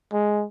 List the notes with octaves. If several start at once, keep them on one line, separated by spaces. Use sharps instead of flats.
G#3